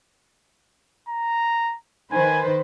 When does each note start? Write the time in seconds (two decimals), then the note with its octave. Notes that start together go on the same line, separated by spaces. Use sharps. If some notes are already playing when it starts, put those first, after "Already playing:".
1.09 A#5
2.12 D#3 B4 C5 G#5